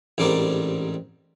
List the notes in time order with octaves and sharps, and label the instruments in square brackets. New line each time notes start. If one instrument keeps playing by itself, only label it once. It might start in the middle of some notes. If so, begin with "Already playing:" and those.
[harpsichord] A1 G#2 G3 C4 A#4 D5